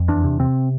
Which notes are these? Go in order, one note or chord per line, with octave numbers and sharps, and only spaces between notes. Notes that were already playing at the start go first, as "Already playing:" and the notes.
Already playing: F2
E2 D4
C3
C3 C4